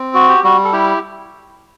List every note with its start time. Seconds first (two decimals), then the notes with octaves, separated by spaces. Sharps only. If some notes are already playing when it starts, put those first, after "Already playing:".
Already playing: C4
0.14 F#4
0.29 G4
0.44 G3 F#4
0.65 A4
0.73 E4 G4